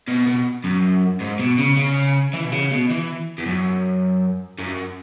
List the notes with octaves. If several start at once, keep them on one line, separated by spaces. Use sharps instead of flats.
B2
B2
F#2
G#2
B2
C#3
C#3
E3
B2
C#3
B2
E3
E2
F#2
F#2